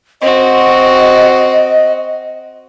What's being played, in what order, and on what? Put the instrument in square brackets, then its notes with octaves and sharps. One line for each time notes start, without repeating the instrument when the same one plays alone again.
[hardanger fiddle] C4 F#4 [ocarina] D#5